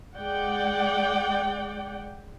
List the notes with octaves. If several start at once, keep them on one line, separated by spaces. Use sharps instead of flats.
G#3 D5 F#5 G5